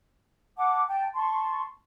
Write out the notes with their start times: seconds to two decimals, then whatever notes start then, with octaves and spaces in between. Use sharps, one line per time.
0.57 F#5 A5 D6
0.88 G5 A5
1.14 A5 C6 C#6